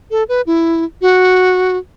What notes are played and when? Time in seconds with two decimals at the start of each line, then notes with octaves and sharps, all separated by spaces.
0.11 A4
0.29 B4
0.47 E4
1.02 F#4